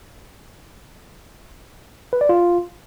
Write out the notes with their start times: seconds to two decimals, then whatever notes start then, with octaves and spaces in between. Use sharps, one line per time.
2.13 B4
2.21 D5
2.29 F4